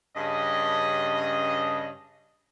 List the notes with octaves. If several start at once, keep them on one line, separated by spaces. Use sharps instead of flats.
G2 C#3 D#5